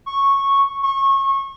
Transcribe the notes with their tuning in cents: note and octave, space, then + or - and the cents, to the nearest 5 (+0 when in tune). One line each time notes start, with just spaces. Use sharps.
C#6 -10
C#6 -25